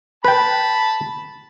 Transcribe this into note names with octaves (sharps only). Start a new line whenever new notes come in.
B4 G5 A5 B5